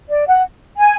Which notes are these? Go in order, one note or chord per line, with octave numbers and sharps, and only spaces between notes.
D5
F#5
G#5